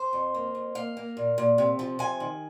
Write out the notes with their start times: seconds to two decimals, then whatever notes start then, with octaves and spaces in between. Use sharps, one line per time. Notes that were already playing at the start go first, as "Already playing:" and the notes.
Already playing: C5
0.13 F2
0.34 A#3
0.55 F2
0.75 A#3 F5
0.97 A#3
1.17 A#2
1.38 A#2
1.58 C3
1.79 F3
1.99 C3 G#5
2.20 D#3